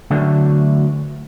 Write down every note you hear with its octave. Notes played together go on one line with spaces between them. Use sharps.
D2 D3 E3 F#3 A3 D4